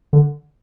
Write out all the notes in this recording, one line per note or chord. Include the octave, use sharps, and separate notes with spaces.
D3